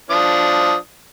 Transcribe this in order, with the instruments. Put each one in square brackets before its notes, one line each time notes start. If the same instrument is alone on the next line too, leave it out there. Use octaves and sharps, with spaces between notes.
[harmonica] F3 D4 D#6